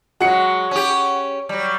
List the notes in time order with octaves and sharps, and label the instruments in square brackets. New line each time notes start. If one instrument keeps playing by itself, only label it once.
[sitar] F#3 G#3 [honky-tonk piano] F#4 C#7
[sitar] C#4 G4
F#3 G3